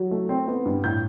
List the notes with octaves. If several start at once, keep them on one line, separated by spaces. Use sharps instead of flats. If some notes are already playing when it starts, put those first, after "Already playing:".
Already playing: F#3
A3
C4
B3
G2
A2 G6